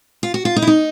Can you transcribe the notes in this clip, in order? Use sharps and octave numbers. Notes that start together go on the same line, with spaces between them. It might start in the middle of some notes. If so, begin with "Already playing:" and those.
F4
F#4
F4
D#4
E4
D#4